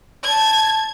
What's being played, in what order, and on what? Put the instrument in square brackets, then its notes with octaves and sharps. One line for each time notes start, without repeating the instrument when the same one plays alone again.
[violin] A5 G#6